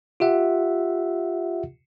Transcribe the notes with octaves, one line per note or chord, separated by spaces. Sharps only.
F4 G4 E5 F#5